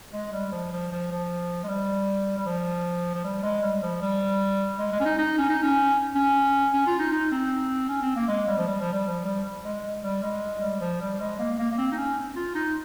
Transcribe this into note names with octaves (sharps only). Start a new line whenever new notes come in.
G#3
G3
F3
F3
F3
F3
G#3
G3
G3
F3
F3
G3
G#3
G3
F3
G3
G#3
G#3
C#4
D#4
D#4
C#4
D#4
C#4
C#4
C#4
F4
D#4
D#4
C4
C#4
C4
A#3
G#3
G3
F3
G3
F3
G3
F3
G3
G#3
G3
G#3
G3
F3
G3
G#3
A#3
A#3
A#3
C4
D#4
C#4
F4
D#4